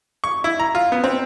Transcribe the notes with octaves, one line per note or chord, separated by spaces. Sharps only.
C#6
E4
A#5
F4
B3
C4